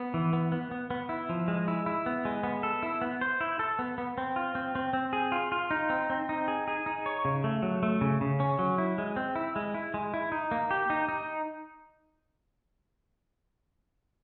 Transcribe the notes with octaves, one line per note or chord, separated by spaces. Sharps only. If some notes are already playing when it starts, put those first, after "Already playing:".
Already playing: B3
E3
B3
B3
B3
B3
E4
F3
G#3
E4
E4
B3
G#3
B3
A4
E4
B3
C5
E4
A4
B3
B3
C4
F4
C4
C4
C4
G#4
F4
F4
D#4
C4
C4
D#4
G#4
G#4
D#4
C#5
C#3
A3
F#3
A3
C#3
C#3
C#4
F#3
E4
G#3
C4
E4
G#3
E4
G#3
E4
D#4
A#3
G4
D#4
D#4